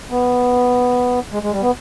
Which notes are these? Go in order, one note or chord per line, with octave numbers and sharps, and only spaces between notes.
B3
G#3
G#3
G3
B3